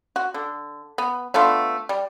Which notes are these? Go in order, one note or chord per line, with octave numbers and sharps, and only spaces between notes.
F#4
D3
B3
A3 B3 D4 F4
G3